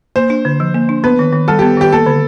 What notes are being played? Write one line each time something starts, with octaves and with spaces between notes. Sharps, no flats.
A#3 C5
D4
D3
F3
A#3
D4
B3 B4
D#3
D#3
G3 A4
B3 G4
D#3 G4
A#3 A4
D3